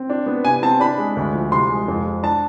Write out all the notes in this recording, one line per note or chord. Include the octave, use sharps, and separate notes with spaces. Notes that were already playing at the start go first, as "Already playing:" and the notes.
Already playing: C4
D4
B3
C3 G#5
C4 A5
D4 B5
G#3
D2
F3
C2 C6
G#3
F2
G#3
D4 A5